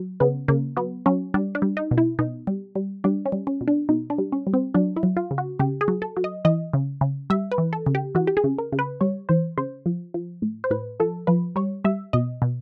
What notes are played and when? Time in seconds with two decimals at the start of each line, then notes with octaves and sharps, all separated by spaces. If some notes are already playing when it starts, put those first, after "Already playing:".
Already playing: F#3
0.20 C#3 B3
0.48 C#3 A#3
0.77 F#3 B3
1.06 F#3 C#4
1.34 G3 D4
1.55 D4
1.62 G3
1.77 D#4
1.91 B2
1.98 E4
2.19 B2 D#4
2.47 G3
2.75 G3
3.04 G3 D4
3.25 C#4
3.32 G3
3.47 C#4
3.61 B2
3.68 D4
3.89 B2 D#4
4.10 D4
4.18 G3
4.32 C#4
4.47 G3
4.54 C4
4.74 F#3 D4
4.96 E4
5.03 F#3
5.17 F4
5.31 C#3
5.38 F#4
5.60 C#3 G4
5.81 G#4
5.88 F#3
6.02 A4
6.17 F#3
6.24 D#5
6.45 E3 D#5
6.73 C#3
7.01 C#3
7.30 G3 E5
7.52 B4
7.58 E3
7.73 A4
7.86 C#3
7.95 G4
8.15 E3 F#4
8.27 G4
8.37 G#4
8.44 C#3
8.58 A#4
8.72 C#3
8.79 B4
9.01 G3 C#5
9.29 E3 C5
9.58 C#3 C5
9.86 F3
10.14 F3
10.42 A2
10.64 C5
10.71 A2 B4
11.00 F3 A4
11.27 F3 B4
11.56 G3 C#5
11.85 G3 E5
12.13 B2 D#5
12.42 B2